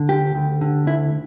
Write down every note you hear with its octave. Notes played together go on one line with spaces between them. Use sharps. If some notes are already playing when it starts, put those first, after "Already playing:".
Already playing: D3
D2 G4
D2
D3
D2 E4